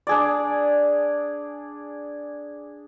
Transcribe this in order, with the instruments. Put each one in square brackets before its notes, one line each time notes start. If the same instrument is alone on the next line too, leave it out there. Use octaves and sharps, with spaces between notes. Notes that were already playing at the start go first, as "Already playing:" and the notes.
[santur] D4 G#4 D5